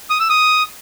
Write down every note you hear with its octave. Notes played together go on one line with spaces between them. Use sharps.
D#6
E6
D#6